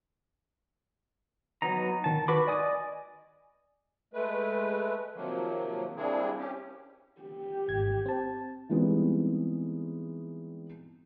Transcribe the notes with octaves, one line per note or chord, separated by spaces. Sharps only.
F#3 B3 D#4 A#5
D#3 A5
F#4 B4 B5 D6
D5 D#5 G#5 D6 D#6
G#3 A3 B4
C3 D#3 F3 F#3 A#3
G3 A#3 C4 D4 E4 G#4
C#4 G4
G4
G#1 G#6
C4 A5
E3 G3 G#3 B3 C4 D#4